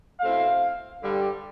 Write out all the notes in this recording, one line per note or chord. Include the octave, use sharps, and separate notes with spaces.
B2 A3 C4 E4 F5
G2 D3 G3